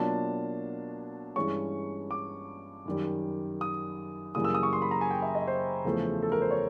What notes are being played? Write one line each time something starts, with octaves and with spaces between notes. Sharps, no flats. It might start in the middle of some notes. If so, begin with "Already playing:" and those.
Already playing: B2 F#3 A#3 D4 F4 A5
G2 E3 G#3 C#4 C#6
D6
F#2 D#3 G3
D#6
F#2 C#3 E3 G3 A#3 D#6
E6
D#6
C#6
C6
B5
A#5
G#5
G5
E5
D#5
C5
E2 C#3 F3 A3
A4
A#4
C5
C#5